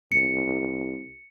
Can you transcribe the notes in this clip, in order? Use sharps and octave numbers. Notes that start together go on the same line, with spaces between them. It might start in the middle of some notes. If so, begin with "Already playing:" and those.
C2 C#7